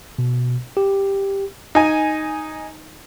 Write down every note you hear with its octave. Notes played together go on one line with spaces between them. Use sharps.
B2
G4
D#4 G#5